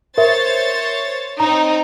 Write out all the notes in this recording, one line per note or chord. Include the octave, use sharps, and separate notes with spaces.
A#4 C5 C#5 E5 A6
C4 D#4 A#5